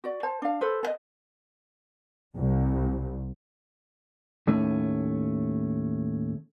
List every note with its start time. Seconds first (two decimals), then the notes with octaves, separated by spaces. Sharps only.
0.04 F#4 D5
0.23 C5 A5
0.42 D4 F5
0.61 A4 B4 C5
0.83 A4 D#5
2.35 C2
4.47 D#2 A2 A3 C#4